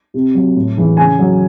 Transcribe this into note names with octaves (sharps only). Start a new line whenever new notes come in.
C3
F#3
A2
E3 G#3
C#3 G#5
F#3